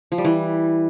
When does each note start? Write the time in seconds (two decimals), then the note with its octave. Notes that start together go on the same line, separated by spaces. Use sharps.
0.12 F3
0.18 G3
0.25 E3